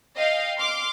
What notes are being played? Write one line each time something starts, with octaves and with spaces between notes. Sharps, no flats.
D#5 F5 G5
C6 D6 F6